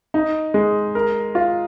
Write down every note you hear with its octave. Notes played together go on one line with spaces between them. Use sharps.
D#4
G#3
A#4
F4